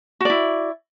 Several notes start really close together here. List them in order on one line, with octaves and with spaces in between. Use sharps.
F#4 D5 E4